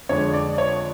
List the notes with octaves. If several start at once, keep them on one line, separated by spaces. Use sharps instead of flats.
F2 D3 G#3 D4 C#5
D5
C#5